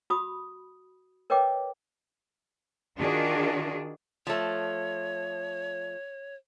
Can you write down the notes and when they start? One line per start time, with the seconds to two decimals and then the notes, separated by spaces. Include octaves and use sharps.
0.10 F#4 B5 D#6
1.30 A#4 B4 C#5 D#5 G5 D6
2.98 D#3 D4 F4 F#4 G#4
4.27 F3 A3 C#5